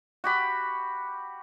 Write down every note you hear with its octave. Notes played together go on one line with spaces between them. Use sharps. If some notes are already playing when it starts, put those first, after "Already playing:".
F#4 G4 B5